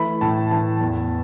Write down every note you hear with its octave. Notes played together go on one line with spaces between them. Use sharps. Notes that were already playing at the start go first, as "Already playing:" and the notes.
Already playing: E3 A3 B5
A2 A5
E3 A5
E2